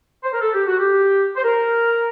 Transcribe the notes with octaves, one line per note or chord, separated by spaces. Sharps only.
C5
A#4
A4
G4
F#4
G4
C5
A#4